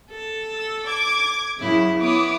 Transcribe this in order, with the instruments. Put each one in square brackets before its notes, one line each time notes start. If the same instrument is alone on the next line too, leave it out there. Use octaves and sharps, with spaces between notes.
[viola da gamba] A4
[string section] E6
D6 G#6
[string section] F#2 C#3 [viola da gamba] E4
[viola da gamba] B3 E4 C#5 [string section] D6 D#6